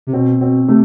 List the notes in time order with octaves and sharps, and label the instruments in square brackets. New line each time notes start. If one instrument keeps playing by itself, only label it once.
[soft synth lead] C3
[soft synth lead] B2 [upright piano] C4
[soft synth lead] B2 [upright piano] C4
[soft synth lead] C3 [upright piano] A3